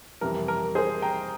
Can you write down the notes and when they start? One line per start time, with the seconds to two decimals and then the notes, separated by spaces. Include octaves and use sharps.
0.21 F2 C3 E3 G3 A#4
0.48 A#4
0.75 G#4 C5
1.02 G5 A#5